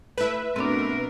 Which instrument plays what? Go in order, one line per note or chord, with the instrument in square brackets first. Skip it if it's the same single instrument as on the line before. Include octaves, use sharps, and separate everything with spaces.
[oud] A3 E4 [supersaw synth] B4 E5
[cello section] B2 A#4 [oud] A3 D5 [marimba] C4 D4